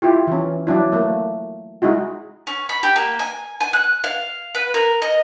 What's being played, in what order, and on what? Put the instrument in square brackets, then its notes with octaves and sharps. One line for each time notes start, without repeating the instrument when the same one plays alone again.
[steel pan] E4 F4 G4
E3 C#4
F#3 D4 E4
A3 A#3
G#3 D#4 E4 F#4
[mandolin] C#4
B5
G4
A#3
G#5
G#5
F#6
F5
B4
A#4
D#5